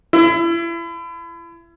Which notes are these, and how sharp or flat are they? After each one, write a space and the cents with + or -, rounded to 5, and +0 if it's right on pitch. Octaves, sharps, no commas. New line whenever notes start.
E4 +35